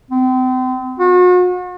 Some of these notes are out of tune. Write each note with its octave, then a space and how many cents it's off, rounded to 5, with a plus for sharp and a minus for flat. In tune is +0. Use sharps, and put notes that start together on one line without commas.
C4 -35
F#4 -40